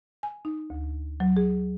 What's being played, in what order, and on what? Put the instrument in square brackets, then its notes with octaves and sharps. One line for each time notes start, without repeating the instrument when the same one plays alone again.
[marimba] G#5
D#4
D2
F#3
G#4